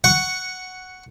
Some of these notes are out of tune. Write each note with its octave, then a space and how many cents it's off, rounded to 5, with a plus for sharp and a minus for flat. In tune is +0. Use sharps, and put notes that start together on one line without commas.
F#5 +0 C#6 +0